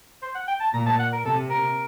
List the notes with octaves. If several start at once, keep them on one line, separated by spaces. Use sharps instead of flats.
C5
F#5
G5
A5
A#2 A#5
A5
F#5
A#4
C3 A4
A#4